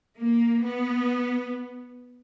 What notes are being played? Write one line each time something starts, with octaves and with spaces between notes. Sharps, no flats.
A#3
B3